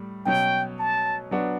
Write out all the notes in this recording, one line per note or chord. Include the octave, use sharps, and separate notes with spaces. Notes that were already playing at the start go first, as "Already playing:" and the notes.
Already playing: A2 G3
B2 F#3 C#4 G5
A5
F#3 B3 D4 F#4